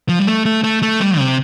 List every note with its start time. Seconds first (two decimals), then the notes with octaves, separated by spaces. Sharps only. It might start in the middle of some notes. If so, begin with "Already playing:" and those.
0.09 F3
0.19 G3
0.27 A3
0.46 A3
0.64 A3
0.82 A3
1.00 G3
1.19 C3